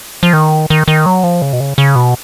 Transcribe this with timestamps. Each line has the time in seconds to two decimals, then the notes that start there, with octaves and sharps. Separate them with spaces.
0.23 F3
0.33 D#3
0.70 D#3
0.88 D#3
1.06 F#3
1.24 F3
1.42 C#3
1.53 B2
1.60 C#3
1.78 C#3
1.96 B2